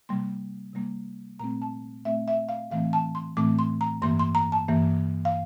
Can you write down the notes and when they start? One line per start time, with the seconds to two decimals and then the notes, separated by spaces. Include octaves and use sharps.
0.09 C3 G3 A#3 C6
0.74 C3 G3 A#3
1.39 A#2 A3 C4 A#5
1.62 A5
2.05 A#2 A3 C4 E5
2.28 E5
2.49 F5
2.71 A2 E3 A3 C4 F5
2.93 A5
3.15 C6
3.37 A2 E3 A3 C4 D6
3.59 C6
3.81 A#5
4.02 G2 E3 A#3 C6
4.19 C6
4.35 A#5
4.52 A5
4.68 G2 E3 A#3
5.25 F5